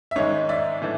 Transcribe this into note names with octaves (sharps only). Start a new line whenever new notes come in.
E5
G#2 D#3 G#3 C#5 D#5
D5 E5
A2 E3 A3 D4